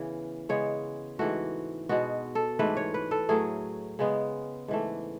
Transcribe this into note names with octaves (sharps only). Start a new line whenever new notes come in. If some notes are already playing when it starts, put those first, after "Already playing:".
Already playing: C#3 E3 B3
C#3 G#3 B3 C#5
G#2 E3 A3 F#4
B2 G#3 B3 F#4
A4
G#2 E3 A3 B4
C#5
B4
A4
A2 F#3 A3 G#4
C#3 G#3 B3
G#2 E3 A3